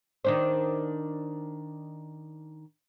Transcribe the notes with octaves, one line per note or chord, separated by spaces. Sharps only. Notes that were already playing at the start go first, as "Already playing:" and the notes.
D#3 D4 C5